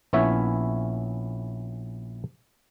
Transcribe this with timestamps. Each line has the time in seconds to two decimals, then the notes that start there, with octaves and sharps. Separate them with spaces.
0.13 A#1 B3 C#4 E4 C#5 E5